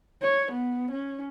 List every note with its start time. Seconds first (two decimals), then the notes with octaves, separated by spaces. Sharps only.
0.22 C#5
0.52 B3
0.91 C#4